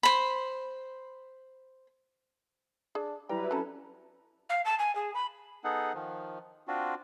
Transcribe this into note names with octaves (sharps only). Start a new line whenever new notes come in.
C5 B5
D4 G#4
F#3 G3 E4 B4 G5 A#5
C4 C#4 A4 A#5
F5
A5
G#5
G#4
B5
B3 D#4 G#4 A4 F#5
D#3 F3
C4 D4 F4 F#4